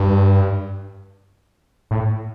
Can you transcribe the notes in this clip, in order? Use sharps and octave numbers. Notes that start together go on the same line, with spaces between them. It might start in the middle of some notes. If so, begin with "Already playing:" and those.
Already playing: G2
A2